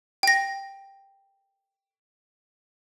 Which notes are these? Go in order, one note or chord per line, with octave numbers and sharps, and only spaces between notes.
G5 A#6